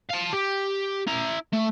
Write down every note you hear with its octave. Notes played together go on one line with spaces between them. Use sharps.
F5 A5
G4
E4 A#5
A3